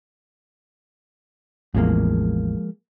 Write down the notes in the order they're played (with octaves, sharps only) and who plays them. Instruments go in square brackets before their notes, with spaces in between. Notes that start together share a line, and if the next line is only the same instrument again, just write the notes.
[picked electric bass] A1 E2 [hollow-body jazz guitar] F3 G#3 A#3